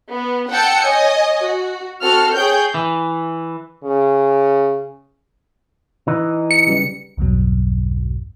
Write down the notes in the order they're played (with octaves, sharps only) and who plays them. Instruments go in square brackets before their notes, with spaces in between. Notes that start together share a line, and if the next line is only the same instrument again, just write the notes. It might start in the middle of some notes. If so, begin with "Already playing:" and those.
[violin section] B3
F#5 G5 A5 E6 G6 C#7
C#5 D#5 G#5
F#4
C4 F#4 A4 F6
G#4 C#5 G5 G6
[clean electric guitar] E3
[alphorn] C#3
[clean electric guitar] E3 D#4
[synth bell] C#7
[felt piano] C#3 G3 B4
[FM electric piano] B1 E2 G2 B2 F#3